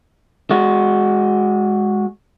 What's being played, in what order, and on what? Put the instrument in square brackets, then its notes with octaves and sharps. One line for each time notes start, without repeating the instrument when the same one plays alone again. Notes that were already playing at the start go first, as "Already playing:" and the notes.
[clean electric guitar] G#3 F#4